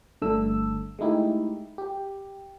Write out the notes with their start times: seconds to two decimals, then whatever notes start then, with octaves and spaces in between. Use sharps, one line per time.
0.22 G1 G2 D3 A3 A4 E6
0.99 G#3 A3 D#4 E4 G4
1.78 G4